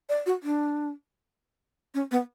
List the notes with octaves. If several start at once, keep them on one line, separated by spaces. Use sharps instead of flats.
D5
F#4
D4
C#4
B3